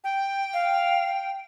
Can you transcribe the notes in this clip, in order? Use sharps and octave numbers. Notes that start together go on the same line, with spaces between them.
G5
F5